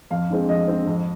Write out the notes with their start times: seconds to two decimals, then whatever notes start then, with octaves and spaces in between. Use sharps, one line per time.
0.11 F2 F5
0.30 D3 G#3 C4
0.48 F2 D#5
0.68 D3 G#3 C4
0.87 F2